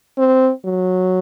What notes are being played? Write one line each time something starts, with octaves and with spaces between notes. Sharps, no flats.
C4
F#3